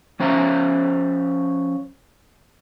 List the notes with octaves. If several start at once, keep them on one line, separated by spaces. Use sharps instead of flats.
F3 C#4 C5 E5 A#5